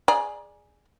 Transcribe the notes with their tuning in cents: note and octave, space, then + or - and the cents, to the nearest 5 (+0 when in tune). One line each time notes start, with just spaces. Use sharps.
G#4 +0 D5 +15 A#5 +35